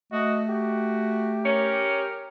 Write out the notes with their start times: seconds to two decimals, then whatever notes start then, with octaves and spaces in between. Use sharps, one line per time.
0.12 A3 F#4 D#5
0.49 F#4 G4
1.45 C#4 A#4